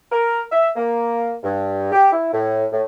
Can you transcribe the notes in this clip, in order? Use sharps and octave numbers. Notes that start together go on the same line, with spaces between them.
A#4
E5
A#3
G2
G4
E4
A2
A2